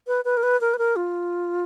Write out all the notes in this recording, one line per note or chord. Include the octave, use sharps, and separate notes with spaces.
B4
B4
A#4
B4
A#4
B4
A#4
F4